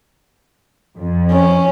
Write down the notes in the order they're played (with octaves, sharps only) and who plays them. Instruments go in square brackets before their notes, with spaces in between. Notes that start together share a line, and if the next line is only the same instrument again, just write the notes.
[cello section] F2
[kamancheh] C#4